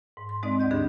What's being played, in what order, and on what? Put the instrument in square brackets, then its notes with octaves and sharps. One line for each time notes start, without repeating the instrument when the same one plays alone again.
[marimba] G#2
C6
G#3 C4 D#4 D5 D#5
D2 D5 D#5 G6
G2 D3 D4 G#4